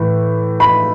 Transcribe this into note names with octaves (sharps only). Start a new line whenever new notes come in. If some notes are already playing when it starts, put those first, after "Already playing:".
Already playing: A2 E3
B5